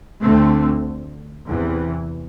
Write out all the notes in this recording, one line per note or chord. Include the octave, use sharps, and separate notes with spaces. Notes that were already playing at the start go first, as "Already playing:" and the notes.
D2 D3 A3 C4
E2 C3 E3